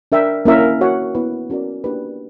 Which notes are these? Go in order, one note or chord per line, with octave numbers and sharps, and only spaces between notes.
D4 A#4 E5 G5
A#3 C#4 E4 A#4 E5
F#4 C#5 F#5
B3 E4 B4
C#4 F#4 A#4 D5
A#3 D4 G4 B4